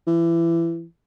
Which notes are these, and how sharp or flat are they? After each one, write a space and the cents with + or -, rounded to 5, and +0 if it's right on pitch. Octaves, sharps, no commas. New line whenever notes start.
E3 +25